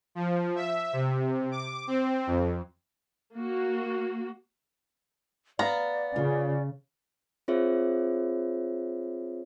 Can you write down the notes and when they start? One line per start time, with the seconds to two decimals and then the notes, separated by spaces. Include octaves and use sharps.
0.15 F3
0.56 E5
0.93 C3
1.52 D6
1.87 C4
2.27 F2
3.34 A#3 F#4
5.59 B3 D5 F5 A#5
6.16 C#3 F4
7.48 C4 F4 G#4 C5 C#5 E5